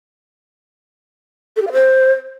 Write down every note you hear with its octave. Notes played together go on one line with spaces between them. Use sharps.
A4
G4
F5
C5